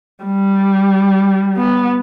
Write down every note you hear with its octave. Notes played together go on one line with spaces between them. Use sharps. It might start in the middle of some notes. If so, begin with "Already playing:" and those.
G3
B3